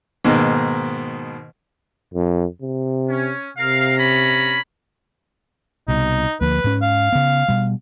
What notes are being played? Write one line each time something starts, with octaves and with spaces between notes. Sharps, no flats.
G#2 B2 D#3 A#3
F2
C3
C#4
C3 A#4 F5
C#4 A#5 B5
C2 B2 D#4
D2 F3 A#3 B4
G#2 C#4
F5
C#3 B3
B2 G3